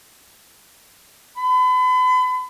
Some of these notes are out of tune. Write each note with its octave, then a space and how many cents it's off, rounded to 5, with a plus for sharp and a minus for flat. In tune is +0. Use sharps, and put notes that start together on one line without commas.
B5 +40